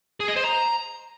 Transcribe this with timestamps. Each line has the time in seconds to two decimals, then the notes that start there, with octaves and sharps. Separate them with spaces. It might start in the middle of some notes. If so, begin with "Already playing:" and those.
0.20 G#4
0.28 D#5
0.36 C5
0.45 A#5